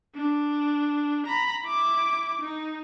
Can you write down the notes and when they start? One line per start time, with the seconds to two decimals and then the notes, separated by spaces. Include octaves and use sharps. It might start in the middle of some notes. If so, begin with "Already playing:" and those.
0.15 D4
1.26 A#5 B5
1.64 E4 D6
2.41 D#4